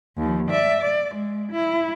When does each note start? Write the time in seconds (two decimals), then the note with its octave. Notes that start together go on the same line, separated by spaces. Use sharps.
0.18 D#2 F3
0.49 D5 E5
0.81 D5
1.14 G#3
1.52 E4